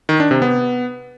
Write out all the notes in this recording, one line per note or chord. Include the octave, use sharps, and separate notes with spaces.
D#3
D4
C3
B3